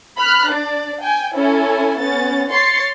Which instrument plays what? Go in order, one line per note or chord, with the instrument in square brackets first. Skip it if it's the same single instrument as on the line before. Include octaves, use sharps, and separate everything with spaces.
[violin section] B5 F6 F#6
D4 D5
G5 G#5
C#4 E4 A4 G#5
B3 C#4 A6
C#5 C6 A6 C7 C#7